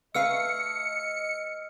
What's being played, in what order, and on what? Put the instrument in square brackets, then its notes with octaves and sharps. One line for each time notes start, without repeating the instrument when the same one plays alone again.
[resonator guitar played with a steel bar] A3 B4 F5 [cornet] D#5 [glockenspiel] E6 F6 C7 [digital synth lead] C#7